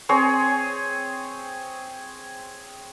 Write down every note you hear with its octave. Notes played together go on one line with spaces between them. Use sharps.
C4 G#4 C#5